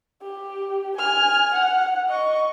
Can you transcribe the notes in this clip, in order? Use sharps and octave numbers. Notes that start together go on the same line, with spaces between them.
G4
G#5 F6
F#5
D#5 C#6